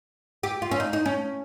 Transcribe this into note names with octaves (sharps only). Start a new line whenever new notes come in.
G4
F4
C#4
D#4
D#4
C#4